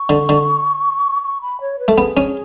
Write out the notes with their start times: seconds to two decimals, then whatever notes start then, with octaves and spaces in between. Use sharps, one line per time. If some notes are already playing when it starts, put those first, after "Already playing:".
Already playing: C#6
0.09 D3
0.29 D3
1.23 C#6
1.41 B5
1.61 C#5
1.79 B4
1.88 A3 A4
1.98 B3 G#4
2.17 C#4